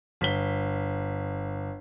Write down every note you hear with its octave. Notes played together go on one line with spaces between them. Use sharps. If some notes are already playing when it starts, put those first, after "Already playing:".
G1 B6 G7